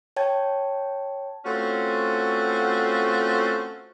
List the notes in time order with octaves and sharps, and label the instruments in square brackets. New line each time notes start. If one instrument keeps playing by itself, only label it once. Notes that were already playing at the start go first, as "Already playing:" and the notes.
[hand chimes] C#5 G5 A5 G#6
[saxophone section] A3 C4 C#4 F4 F#4